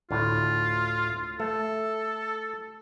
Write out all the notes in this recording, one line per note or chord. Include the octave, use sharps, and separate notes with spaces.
D2 A2 F4
A3 A4